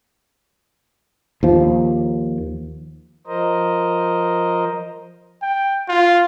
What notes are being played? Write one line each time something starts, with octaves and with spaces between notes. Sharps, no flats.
D#2 F3
F3 A#4 C5 D#5
G5
F4